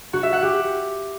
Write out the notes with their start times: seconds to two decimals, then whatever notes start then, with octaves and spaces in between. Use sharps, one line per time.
0.13 F#4
0.23 E5
0.33 F#5
0.42 G4